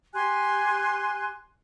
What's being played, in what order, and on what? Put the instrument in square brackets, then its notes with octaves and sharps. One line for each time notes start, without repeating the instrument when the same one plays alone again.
[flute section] G4 G#5 C6 F#6